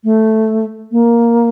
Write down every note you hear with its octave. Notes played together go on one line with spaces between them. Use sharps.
A3
A#3